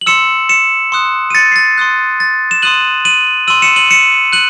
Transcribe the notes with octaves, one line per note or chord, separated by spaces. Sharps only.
F#7
C6 E6 C#7 E7
C#7 E7
C6 D#6 F#6
D#7
A6 C#7
C7
A6
C6 D#6 F#6
A6
E7
C6 D#6 F#6 D#7 F#7
D#7 F#7
C6 E6 D#7 F#7
C#7 E7
D#7 F#7
C#7 E7
F#6 D#7 F#7